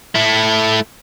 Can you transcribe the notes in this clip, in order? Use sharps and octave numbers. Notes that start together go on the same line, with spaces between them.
A3 E4